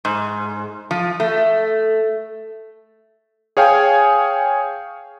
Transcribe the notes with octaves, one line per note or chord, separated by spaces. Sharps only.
G#2
F3
A3
G#4 C#5 F5 G5 G#5